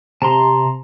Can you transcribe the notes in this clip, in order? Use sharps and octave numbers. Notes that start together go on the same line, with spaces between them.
C3 A5 A#5 C6